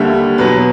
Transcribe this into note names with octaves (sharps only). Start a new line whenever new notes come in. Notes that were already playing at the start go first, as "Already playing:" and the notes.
Already playing: D#2 D3 G3 E5
E2 B2 F#3 B4